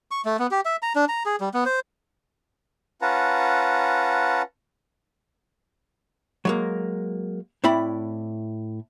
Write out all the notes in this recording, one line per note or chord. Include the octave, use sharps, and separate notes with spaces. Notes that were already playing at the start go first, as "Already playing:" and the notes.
C#6
A3
B3
G4
E5
A#5
D4
A#5
G#4
G3
B3
C5
C#4 F4 B4 F#5 A5 A#5
F#3 G#3 A#3
A2 C4 E4 D5 B5